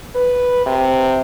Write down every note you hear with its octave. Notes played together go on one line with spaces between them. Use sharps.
B4
C3